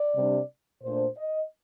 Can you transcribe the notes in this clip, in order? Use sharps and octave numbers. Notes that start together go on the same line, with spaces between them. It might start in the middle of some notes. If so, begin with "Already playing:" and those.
Already playing: D5
C3 G3 D4
A#2 A3 D4 C5
D#5